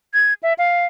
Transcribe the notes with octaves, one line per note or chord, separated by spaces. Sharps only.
G#6
E5
F5